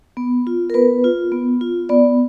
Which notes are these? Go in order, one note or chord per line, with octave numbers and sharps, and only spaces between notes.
B3
F4
A#4
B3 B4
F4
B3
F4
B3 D5